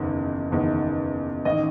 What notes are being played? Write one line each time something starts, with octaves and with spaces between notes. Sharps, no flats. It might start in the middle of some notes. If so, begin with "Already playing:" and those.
Already playing: F#1 E2 D#3
F#1 E2 D#3
A1 D#3 D#5